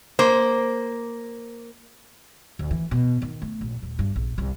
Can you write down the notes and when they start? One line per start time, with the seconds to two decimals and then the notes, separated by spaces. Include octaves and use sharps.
0.19 A#3 C5
2.59 D2
2.71 E3
2.91 B2
3.22 D#3
3.42 A3
3.61 A#1
3.82 D#1
3.99 G2
4.16 A#1
4.38 C2